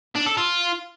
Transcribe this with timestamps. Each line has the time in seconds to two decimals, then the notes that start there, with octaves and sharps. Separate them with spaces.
0.15 D4
0.26 A4
0.37 F4